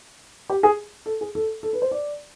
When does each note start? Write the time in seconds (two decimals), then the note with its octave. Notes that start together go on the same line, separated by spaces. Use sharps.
0.50 G4
0.63 G#4
1.06 A4
1.21 G#4
1.35 A4
1.63 A4
1.73 B4
1.82 C5
1.91 D5